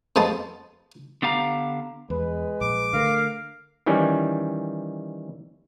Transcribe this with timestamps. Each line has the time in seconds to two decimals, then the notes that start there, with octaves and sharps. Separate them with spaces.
0.16 F2 G#3 B3 A5 C6
1.22 D3 B3 G4 F5 A5 A#5
2.10 E2 G#3 B4
2.61 A#1 D6
2.93 D3 A3 A#4 F5
3.86 D#3 E3 G3 C#4